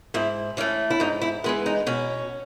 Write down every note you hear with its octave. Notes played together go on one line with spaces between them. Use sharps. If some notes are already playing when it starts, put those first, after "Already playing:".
G#2 E4
E3 A3 C#4
E4
G#2 D#4
E4
E3 G#3 B3 B4
D#4
B2 C#4